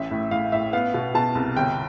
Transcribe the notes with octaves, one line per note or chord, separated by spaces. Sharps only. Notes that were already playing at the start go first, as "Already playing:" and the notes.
Already playing: A1 E5
A2
A2 F5
A2 E5
B3 F5
B2
B2 A5
C2
G1 G5